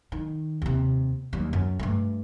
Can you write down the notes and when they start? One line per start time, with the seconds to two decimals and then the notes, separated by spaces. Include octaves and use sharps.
0.12 D#3
0.62 D#2 C3
1.33 D#2 G3
1.53 F#2
1.79 G2 A3